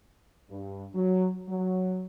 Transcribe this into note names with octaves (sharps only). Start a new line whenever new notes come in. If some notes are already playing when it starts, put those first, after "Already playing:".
G2
F#3
F#3